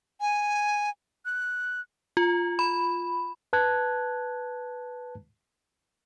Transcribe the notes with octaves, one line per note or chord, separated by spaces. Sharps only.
G#5
F#6
F4
B5
B4 A5 F#6 G#6